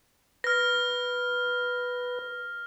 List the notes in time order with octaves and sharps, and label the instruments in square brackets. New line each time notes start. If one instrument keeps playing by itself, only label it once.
[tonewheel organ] B4 [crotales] F6 A#6